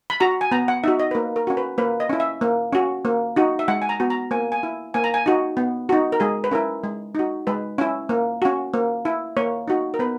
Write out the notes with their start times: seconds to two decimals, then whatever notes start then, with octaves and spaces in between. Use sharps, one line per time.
0.10 B5
0.20 F#4 A#5
0.41 G#5
0.51 B3 A#5
0.68 F#5
0.84 D#4 F#4 E5
0.99 D#5
1.11 B4
1.15 A#3 A#4
1.36 A#4
1.47 C#4 F#4
1.57 B4
1.78 A#3 B4
2.00 D#5
2.10 C#4 E4
2.20 E5
2.41 A#3
2.73 C#4 F#4
3.05 A#3
3.36 D#4 F#4
3.59 E5
3.68 G#3 F#5
3.82 G#5
3.89 A#5
4.00 B3 F#4
4.10 A#5
4.31 A#3 G#5
4.52 G#5
4.63 E4
4.94 A#3 G#5
5.04 A#5
5.14 G#5
5.26 D#4 F#4
5.57 B3
5.89 D#4 F#4
6.12 A#4
6.20 G#3 G#4
6.44 B4
6.51 C#4 E4 A#4
6.84 G#3
7.15 D#4 F#4
7.47 G#3 B4
7.78 C#4 E4
8.09 A#3
8.42 C#4 F#4
8.74 A#3
9.05 E4
9.37 A#3 C#5
9.68 D#4 F#4
9.94 A#4
9.99 B3 B4